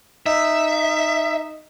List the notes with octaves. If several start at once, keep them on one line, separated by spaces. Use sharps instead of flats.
D#4 E5